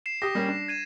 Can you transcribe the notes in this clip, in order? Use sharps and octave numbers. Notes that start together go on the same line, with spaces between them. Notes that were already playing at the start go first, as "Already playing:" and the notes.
C7 E7
G4 D#6 A#6
G3 A#3 C#4
D4
G#6 D#7 E7